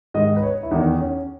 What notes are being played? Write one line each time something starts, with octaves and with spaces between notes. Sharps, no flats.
G#2 D#3 D#5
B4
C#5
E4
E2 D#3 D#4
C#4